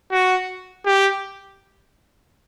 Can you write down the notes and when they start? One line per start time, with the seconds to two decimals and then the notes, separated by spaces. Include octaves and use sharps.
0.13 F#4
0.86 G4